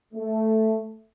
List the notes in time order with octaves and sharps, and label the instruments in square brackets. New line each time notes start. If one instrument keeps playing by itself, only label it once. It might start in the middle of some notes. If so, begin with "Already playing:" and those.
[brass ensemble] A3